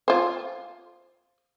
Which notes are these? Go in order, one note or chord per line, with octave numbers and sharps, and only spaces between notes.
F4 C5